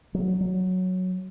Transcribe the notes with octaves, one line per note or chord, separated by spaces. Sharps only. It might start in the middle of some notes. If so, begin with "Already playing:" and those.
F#3
F#3